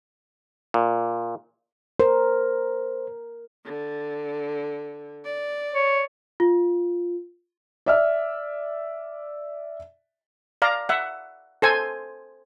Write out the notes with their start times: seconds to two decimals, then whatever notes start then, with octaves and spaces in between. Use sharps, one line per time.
0.74 A#2
2.00 A#4 C5
3.65 D3
5.25 D5
5.74 C#5
6.40 F4
7.86 D5 E5 F6
10.62 D5 F5 A#5
10.89 E5 F#5
11.62 A4 C5 G#5